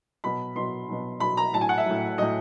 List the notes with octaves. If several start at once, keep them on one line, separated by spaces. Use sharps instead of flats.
B2 F#3 B5
B2 F#3 C6
B2 F#3
B2 F#3 B5
A#5
A2 F#3 A5
G#5
F#5
E5
A2 F#3
A2 F#3 D#5